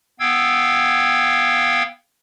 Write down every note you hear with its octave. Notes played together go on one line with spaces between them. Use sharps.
B3 F5 G5 E6 G#6